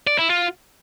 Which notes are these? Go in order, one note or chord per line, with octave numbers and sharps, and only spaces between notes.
D5
E4
F4